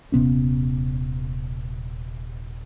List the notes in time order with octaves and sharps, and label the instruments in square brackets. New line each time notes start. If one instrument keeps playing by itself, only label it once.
[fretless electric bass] D#1 C3 B3 C#4